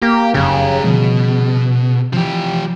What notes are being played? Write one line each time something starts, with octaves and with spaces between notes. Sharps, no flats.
A#3 G4
F1 F#2 C#3 G4 A#4
B2 D3 F3 G3
C3 E3 F3 G4